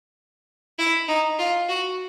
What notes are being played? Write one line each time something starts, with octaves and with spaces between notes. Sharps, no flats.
E4
D#4
F4
F#4